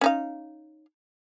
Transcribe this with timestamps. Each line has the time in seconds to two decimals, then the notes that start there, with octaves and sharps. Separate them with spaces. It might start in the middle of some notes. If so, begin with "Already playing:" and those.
0.01 C#4 D#4 F5